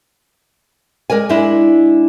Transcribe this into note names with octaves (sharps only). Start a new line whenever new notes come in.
G#3 A#4 D5 G#5
G#3 D4 E4